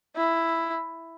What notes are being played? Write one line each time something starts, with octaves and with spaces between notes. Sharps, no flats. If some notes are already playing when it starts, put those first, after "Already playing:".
E4